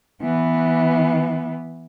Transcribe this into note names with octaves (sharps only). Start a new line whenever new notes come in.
E3 B3